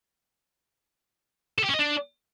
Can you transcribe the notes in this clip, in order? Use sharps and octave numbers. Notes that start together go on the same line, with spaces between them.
A4
G4
C#4
D#5
D4